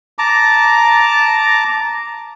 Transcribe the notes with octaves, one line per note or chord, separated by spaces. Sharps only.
A5 A#5 D6